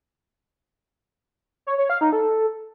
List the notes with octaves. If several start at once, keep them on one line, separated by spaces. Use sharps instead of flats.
C#5
C#5
F5
D#4
A4